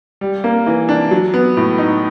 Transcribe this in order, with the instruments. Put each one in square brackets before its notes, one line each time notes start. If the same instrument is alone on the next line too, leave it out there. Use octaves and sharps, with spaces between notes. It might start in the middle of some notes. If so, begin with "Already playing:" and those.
[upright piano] G3
A#3
E3
D4
F#3
B3
A2
D#4